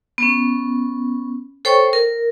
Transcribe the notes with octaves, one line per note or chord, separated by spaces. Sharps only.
B3 C#4
A4 C5 C#5 G5 C#6
A#4